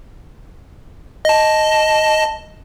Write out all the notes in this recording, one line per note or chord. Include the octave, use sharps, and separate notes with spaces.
D#5 A5